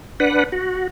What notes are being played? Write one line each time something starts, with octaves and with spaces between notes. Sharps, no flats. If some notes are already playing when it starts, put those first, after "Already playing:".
D4 B4 F#5
F#4